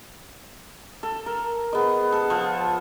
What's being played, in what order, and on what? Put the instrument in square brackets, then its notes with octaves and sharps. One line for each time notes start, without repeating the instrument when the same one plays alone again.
[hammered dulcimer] A4
A#4
[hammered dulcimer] B3 D#5 [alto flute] G#4
[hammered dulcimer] A4
F3
[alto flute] A5